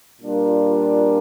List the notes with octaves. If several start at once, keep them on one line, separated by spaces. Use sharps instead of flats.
A#2 G3 D4 F4 A#4